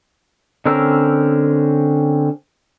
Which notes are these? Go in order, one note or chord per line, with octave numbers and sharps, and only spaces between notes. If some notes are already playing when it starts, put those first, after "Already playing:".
D3 C4 C#4 A#4 E6